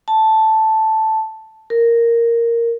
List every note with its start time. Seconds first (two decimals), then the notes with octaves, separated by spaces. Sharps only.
0.08 A5
1.70 A#4